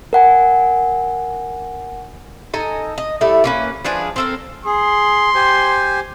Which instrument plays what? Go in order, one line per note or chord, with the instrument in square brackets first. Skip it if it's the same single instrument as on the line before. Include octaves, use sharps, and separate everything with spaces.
[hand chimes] A#4 F#5 G#5
[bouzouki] D#4 A4 G#5 A#5
D#5
G3 A3 E4 A4
A#3 C#4 B4
F3 D4 G#4 B4
C4 A4 A#4
[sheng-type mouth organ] G#4 [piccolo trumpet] C6
[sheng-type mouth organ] G4 C5 G#5